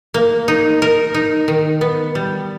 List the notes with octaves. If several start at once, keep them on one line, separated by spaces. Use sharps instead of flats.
A#3
D#4
A#4
D#4
D#3
B3
G3